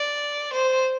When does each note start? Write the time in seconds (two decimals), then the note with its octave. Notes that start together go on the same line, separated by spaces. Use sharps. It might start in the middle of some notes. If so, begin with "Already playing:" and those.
Already playing: D5
0.53 C5